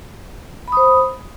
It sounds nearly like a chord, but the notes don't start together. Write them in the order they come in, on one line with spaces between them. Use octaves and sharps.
B5 D#6 C5